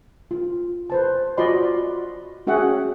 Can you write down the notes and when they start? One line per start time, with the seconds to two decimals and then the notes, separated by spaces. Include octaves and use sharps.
0.31 F4
0.90 B4 C5 A5
1.37 F4 F#4 D5 D#5 B5 C6
2.47 C#4 F#4 G#4 E5 F#5 G5